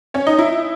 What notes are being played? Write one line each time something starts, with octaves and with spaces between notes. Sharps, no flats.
C#4 C#5
D#4 D#5
E4 E5